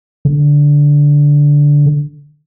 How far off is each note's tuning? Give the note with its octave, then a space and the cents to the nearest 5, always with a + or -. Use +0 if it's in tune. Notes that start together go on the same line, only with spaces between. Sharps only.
D3 -10